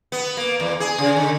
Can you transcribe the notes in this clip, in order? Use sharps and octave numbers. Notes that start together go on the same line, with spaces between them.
B3
A#3
E2
G#4
C#3
D3